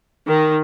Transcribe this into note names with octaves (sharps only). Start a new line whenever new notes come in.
D#3